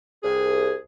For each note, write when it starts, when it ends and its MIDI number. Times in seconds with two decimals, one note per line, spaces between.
0.24 0.75 36
0.24 0.75 68